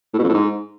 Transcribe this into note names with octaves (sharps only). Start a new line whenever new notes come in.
A2
B2
F2
A2
G#2